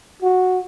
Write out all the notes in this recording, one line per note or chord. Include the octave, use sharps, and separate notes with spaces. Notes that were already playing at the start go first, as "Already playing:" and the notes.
F#4